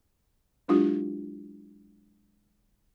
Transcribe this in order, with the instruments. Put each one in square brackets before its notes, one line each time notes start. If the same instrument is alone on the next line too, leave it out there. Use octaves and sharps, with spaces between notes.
[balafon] F#3 G#3 D4 E4 F4 G4